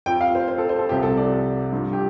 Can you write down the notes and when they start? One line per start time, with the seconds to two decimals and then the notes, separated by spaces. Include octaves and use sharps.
0.06 F2 F3 G5
0.21 F5
0.35 C5
0.48 C5
0.58 A4
0.69 C5
0.79 A4
0.89 C2 C3 F3 G4
1.03 A4
1.17 D5
1.72 G2 F3
1.93 G4